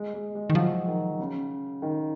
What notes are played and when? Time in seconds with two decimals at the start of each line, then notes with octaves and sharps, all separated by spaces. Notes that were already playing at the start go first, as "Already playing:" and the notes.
Already playing: G#3
0.14 G#3
0.35 G#3
0.50 D#3
0.55 F3 F#3
0.88 D#3
1.20 C#3
1.82 D#3